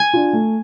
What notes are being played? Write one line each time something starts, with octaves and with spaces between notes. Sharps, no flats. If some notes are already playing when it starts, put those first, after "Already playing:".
Already playing: G#5
D4 F4
A3